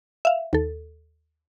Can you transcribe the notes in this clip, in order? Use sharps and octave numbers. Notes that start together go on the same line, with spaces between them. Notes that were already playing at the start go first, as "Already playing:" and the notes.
E5 F5
D#2 A4